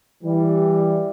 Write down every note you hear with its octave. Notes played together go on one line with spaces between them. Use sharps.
E3 G3